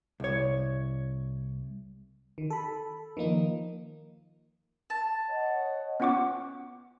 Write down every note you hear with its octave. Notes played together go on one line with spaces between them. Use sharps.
C2 C#5
D#3
A4 B5
D#3 F3 A#3 D#4
A5
C#5 D#5 F#5
B3 C#4 F4 F#5 C#6 D6